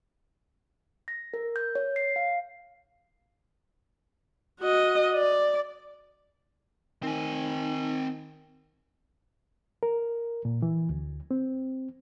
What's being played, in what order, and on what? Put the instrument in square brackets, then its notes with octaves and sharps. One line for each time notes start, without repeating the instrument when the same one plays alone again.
[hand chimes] A#6
A#4
G6
C#5
C7
F5
[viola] F#4 D#5
D5
[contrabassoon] D#3 [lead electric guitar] C4 G#5
[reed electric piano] A#4
A#2
E3
D2
C4